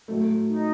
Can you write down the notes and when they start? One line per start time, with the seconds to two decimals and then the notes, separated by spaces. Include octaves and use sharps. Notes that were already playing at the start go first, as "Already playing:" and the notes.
0.08 A2 F#3 A3
0.48 D#4